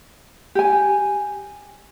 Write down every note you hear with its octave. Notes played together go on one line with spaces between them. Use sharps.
G4 G#5